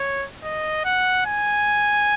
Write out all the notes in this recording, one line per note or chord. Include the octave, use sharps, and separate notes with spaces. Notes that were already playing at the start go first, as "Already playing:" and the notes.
Already playing: C#5
D#5
F#5
G#5